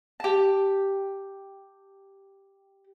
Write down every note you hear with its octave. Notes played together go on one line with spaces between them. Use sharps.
G4 A5